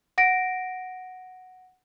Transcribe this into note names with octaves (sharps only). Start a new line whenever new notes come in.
F#5 A#6 D7